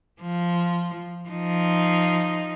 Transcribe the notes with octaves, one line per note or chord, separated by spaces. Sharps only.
F3
F3 D#4